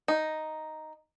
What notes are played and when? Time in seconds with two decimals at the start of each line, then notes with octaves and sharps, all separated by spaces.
0.08 D#4